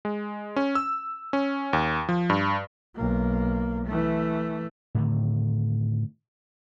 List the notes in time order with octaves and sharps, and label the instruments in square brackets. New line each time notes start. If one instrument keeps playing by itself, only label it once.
[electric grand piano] G#3
C#4
E6
C#4
D#2
F3
G2
[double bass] B1 A#3
E3 A3
[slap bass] A2 D3 D#3